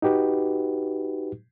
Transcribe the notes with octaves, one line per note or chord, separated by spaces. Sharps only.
D#4 F#4 G4 B4